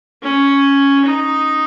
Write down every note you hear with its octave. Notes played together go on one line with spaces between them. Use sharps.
C#4
D#4